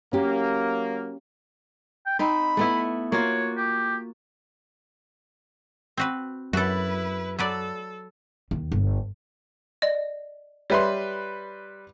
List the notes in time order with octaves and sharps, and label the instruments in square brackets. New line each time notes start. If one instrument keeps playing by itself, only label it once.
[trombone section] F#3 A#3 [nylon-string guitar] C#4 G4
[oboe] G5
[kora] C4 D#4 [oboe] B5
[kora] A3 B3 E4
[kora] A#3 F4 F#4 [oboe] C#5
[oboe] G4
[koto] C4 F#4 B4
[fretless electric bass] F#2 [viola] E4 B4 [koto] F#4 A4
[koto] F#3 B4 D5 [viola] A4
[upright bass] D#2
G1
[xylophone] D5 D#5
[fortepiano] G3 B4 C6 [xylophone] C#5 E5